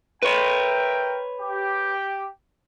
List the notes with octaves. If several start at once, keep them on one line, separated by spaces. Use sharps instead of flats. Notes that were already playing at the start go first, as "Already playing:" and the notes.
A#4 B4 C#5 E5 G5
G4